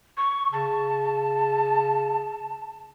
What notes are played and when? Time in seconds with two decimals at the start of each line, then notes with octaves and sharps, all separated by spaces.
0.17 C#6
0.53 C#3 A5